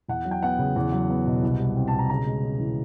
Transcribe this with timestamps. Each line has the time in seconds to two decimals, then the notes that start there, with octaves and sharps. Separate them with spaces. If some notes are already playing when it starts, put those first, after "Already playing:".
0.08 E2 F#5
0.25 F#3
0.31 G5
0.42 B3 F#5
0.59 C#3
0.76 E2
0.92 F#3
1.10 B3
1.26 B2
1.43 C2
1.60 G3
1.77 C4
1.88 A5
1.94 B2
1.99 A#5
2.10 C#3 A#5
2.26 G#3
2.43 C#4
2.59 E3